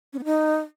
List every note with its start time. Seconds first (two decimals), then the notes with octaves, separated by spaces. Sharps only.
0.13 C#4
0.19 B3
0.25 D#4